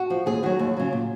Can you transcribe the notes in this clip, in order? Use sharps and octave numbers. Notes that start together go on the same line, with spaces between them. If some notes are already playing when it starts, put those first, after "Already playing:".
Already playing: F#4
F3
D#2 G#4
D#3 F#3 F#4
D#2
C#3 F#3
A#2